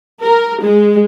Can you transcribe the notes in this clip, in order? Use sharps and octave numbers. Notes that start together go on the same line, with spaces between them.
A#4
G#3